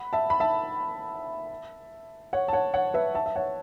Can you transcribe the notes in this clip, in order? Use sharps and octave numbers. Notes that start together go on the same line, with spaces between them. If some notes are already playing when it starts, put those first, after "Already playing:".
Already playing: F#5 B5
E5 A5
B5
E5 A5
C#5 F#5
A5
C#5 F#5
C#5 F#5
B4 E5
E5 A5
E5
C#5 F#5